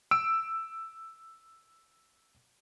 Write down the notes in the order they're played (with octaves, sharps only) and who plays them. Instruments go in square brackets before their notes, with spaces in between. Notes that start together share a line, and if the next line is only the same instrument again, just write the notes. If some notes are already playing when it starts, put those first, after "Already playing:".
[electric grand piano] E6 D7